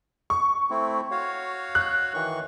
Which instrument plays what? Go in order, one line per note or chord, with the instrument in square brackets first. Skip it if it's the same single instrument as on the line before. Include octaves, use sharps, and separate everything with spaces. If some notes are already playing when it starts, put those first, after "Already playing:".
[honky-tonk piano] C#6
[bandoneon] A3 C4 E4
F#4 C#5 F5
[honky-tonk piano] F#6
[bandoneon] D#3 E3 C#6